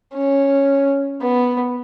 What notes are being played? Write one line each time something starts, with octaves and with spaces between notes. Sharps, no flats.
C#4
B3